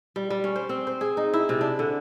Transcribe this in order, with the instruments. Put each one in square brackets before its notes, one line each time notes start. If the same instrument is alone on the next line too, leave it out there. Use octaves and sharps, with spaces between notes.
[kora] G3
G3
C#4
C5
C4
C5
G#4
D#4
E4
C3
D4
D3